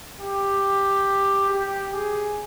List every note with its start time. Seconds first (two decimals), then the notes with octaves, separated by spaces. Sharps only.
0.21 G4
1.50 G4
1.94 G#4